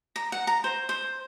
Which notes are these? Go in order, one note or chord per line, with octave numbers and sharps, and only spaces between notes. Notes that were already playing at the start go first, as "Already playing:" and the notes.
A#5
F#5
A#5
C5
C5